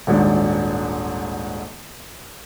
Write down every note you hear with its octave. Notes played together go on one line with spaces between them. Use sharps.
D#1 G#1 G#2 D4